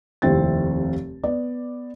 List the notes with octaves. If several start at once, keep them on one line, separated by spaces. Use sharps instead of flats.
F1 D#2 C3 C4 E4 A6
B3 D5